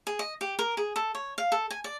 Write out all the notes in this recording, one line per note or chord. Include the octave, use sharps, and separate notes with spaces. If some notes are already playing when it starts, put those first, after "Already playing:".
G#4
D#5
G4
A#4
G#4
A4
C#5
F5
A4
G#5
D5